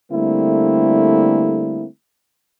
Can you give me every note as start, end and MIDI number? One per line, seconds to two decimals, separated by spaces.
0.12 1.86 50
0.12 1.86 55
0.12 1.86 57
0.12 1.86 58
0.12 1.86 60
0.12 1.86 64